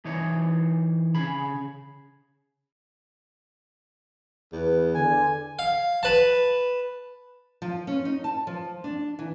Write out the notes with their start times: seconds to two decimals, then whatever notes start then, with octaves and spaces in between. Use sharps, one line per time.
0.05 E3 D#4 C5 C#5
1.15 C#3 G#4 G#5 B5
4.53 E2 B4
4.95 D3 G#5
5.59 F5
6.03 B4 A5
7.62 F3
7.87 C#4
8.05 D#4
8.24 A5
8.47 F3
8.84 D4
9.19 E3